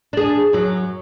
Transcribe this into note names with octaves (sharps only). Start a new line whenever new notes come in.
D4 G#4
F#2 F#3